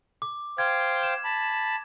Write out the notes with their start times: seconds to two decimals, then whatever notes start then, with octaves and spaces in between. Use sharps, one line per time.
0.22 D6
0.58 C5 F5 G5 G#6
1.03 E7
1.24 A5 B5